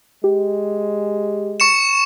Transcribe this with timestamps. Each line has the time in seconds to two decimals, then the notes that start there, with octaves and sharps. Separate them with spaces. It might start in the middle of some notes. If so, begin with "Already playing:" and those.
0.24 G#3 G4
1.60 C#6 C#7 E7